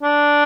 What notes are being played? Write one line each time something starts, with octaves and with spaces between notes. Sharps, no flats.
D4